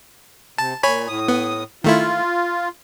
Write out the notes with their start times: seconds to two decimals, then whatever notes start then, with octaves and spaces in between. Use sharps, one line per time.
0.58 C3 A5
0.83 A#2 C#5 G#5 B5
1.08 A2 D#6
1.28 B3
1.84 D#3 A3 E4 F4